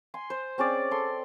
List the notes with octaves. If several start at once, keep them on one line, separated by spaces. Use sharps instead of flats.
G#5 C6
C5
C4 C#4 G#4 D5
A4 C6